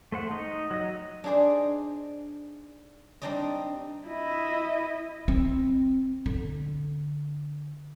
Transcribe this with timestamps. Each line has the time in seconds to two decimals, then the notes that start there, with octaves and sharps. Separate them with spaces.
0.12 A3 C5 F#5
0.31 D#4
0.71 F#3 D#5
1.24 D4 D#4 G#4 C5 D5
3.22 G3 C4 D4 D#4 D5 D#5
4.07 E4 D#5
5.28 C4
6.26 D3